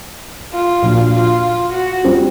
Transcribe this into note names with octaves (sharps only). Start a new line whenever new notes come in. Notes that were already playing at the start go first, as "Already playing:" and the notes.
F4
A#2 F3 A#3 D4 F#4
F4
F#4
G3 C4 F4